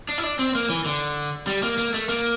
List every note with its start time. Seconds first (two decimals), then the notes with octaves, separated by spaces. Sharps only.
0.09 D4
0.18 E4
0.23 D4
0.39 C4
0.55 A#3
0.70 E3
0.86 D3
1.47 G3
1.63 A#3
1.78 A#3
1.94 A3
2.09 A#3